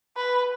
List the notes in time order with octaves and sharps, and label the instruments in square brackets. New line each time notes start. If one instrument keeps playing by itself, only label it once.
[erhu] B4